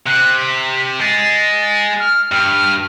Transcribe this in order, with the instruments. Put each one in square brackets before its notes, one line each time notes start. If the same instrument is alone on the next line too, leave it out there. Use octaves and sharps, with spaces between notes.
[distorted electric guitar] C3 [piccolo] F#6
[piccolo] B6
[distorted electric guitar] G#3 [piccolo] A6
[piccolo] A6
F6
[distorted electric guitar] G2 [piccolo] F6